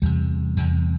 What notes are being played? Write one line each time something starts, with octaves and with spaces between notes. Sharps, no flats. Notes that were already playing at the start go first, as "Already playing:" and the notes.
E2 C3 G3
E2 C3